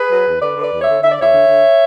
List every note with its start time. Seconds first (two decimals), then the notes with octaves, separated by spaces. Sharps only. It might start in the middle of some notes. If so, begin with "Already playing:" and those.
Already playing: G#4 B4
0.09 F#3
0.25 E2
0.40 D3 B4 D5
0.56 D3
0.61 B4 D5
0.71 E2
0.81 C#5 E5
0.87 D3
1.02 D3 E5
1.11 D5
1.17 E2 C#5 E5
1.34 D3
1.48 D3